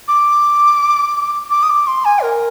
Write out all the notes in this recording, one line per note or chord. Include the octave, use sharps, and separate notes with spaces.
D6
D6
D#6
D6
C6
G#5
A#4